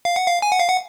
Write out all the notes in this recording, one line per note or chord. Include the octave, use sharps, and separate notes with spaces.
F5
F#5
F5
G#5
F#5
F5
F#5